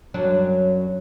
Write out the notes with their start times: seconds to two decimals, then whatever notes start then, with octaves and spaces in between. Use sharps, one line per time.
0.14 F#2 F#3 D4